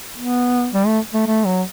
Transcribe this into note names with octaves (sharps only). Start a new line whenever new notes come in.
B3
G3
A3
A3
A3
F#3